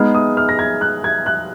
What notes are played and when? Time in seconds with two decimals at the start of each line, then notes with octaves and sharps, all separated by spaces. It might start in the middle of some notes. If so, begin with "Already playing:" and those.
Already playing: G#3 B3 D#4 G#4 F6
0.15 D#6
0.37 F6
0.49 A#6
0.59 G#6
0.81 F#6
1.04 G#6
1.26 F#6